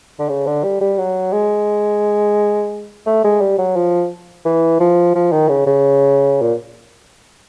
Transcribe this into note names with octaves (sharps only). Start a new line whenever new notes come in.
D3
C#3
D3
G3
G3
F#3
G#3
A3
G#3
G3
F#3
F3
E3
F3
F3
D#3
C#3
C#3
A#2